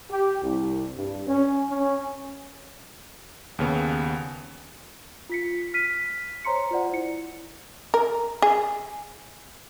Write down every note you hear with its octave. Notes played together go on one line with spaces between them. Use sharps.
G4
C2
G2
C#4
C#4
D#2 C#3 B3
F4 B6 C#7
F6 B6 D#7
C5 C#5 A#5 C6 C#7
F4 C5 D5 F#5
E4 C#7
A#4
G#4